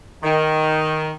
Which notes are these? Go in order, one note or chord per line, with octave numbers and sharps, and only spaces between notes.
D#3